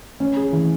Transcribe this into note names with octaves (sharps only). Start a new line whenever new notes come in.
C#4
G#4
E3